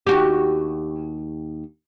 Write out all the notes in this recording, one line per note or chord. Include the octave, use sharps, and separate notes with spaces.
D#2 F#4 G4